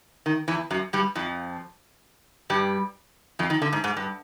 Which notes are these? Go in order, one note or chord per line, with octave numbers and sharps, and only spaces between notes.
D#3
E2 E3
F#2 F#3
G2 G3
F2 F3
G2 G3
F2 F3
D#3
D3
G#2
G#2
G2